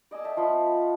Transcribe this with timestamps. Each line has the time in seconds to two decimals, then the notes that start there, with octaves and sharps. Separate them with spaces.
0.11 D5 D#5 G#5 E6
0.24 D#5 E5 G5 A5
0.37 F3 F4 B5
0.48 C4
0.66 B5
0.82 F#5